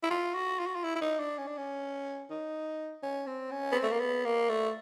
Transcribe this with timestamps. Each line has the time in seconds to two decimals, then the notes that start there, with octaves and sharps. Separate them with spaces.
0.03 E4
0.10 F4
0.34 F#4
0.59 F4
0.66 F#4
0.75 F4
0.84 E4
0.95 E4
1.01 D#4
1.19 D4
1.38 C#4
1.47 D4
1.57 C#4
2.30 D#4
3.03 C#4
3.27 C4
3.51 C#4
3.72 B3
3.75 C4
3.83 A3
3.91 A#3
4.00 B3
4.25 A#3
4.49 A3